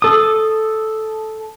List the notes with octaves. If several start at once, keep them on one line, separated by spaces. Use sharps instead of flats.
A4 D#6